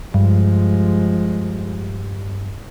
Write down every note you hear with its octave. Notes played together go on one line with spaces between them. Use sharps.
G2 F3 G#3